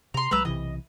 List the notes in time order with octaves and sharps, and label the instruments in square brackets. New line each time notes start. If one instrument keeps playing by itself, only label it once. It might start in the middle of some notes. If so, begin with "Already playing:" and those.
[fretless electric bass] C3 [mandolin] A#5 C6
[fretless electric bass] C2 F#3 G#3 [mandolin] B4 A#5 E6
[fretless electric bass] B1 C3 E3 [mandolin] D#5